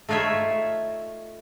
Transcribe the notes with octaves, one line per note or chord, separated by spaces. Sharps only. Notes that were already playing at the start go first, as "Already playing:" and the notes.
A3 D#4 F4 C#5 E5